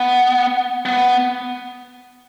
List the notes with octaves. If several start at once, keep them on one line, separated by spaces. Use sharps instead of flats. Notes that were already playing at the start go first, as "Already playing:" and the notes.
Already playing: B3
B3